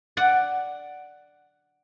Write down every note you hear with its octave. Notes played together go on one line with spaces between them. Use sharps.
D5 F#5